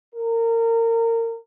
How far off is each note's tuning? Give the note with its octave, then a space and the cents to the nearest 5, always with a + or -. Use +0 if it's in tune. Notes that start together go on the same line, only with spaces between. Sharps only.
A#4 -25